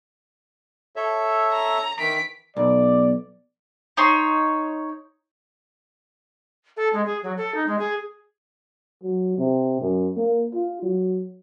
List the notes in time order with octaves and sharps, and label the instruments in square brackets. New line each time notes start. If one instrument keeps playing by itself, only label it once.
[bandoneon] A4 C#5 E5
[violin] A#5
[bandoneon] D#3 E3 [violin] B6 D7
[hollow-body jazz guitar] B1 [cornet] D5
[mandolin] D#4 C#5 C6
[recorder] A4
G#3
G#4
F#3
A4
D#4
G#3
G#4
[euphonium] F#3
C3
F#2
A#3
F4
F#3